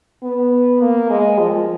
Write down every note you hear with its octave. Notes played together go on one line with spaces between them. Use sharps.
B3
A#3
G#3
F3